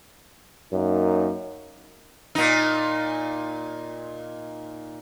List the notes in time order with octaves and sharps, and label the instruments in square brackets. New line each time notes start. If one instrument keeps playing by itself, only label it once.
[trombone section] F#2 A#3 D#4
[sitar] A#2 D#4